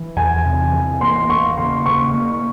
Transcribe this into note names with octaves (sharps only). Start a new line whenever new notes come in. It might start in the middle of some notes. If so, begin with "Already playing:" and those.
Already playing: E3
E2 G#5
C3
E3
A#3 C6
A#3 C#6
C#3 C6
C#3 C#6
A#3